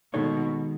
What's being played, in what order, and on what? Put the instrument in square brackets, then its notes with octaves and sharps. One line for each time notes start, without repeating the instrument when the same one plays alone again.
[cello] B2 [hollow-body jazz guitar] D#3 G#3 D#4 A4 C#5